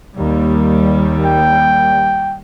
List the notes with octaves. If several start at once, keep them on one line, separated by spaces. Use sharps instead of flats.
D#2 G3
G5